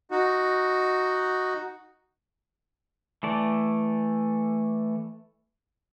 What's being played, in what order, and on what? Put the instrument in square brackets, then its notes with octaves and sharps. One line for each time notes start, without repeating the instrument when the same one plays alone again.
[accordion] D#4 F#4
[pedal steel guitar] E3 A3 D5